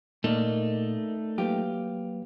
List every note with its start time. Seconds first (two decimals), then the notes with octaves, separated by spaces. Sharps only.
0.24 A#2 A3 A#3 D#4 A#4 D5 D#5
1.38 F#3 A#3 F4 G4 B4